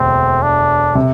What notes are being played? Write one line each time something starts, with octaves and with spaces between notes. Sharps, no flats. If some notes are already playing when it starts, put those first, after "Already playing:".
Already playing: E1 D2 C4
D4
C3